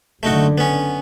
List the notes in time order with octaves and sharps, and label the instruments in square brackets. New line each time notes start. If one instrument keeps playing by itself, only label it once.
[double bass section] F#1 D3 [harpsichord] A3 D#4 F#4
[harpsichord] B3 C#4